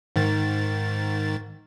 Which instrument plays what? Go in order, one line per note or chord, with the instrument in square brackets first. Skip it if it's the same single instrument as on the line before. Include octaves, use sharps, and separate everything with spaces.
[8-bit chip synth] G#2 D#3 A6